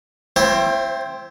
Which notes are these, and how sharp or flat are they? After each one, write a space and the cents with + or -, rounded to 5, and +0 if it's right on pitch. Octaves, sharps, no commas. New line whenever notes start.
C4 +0 E4 +35 C5 +35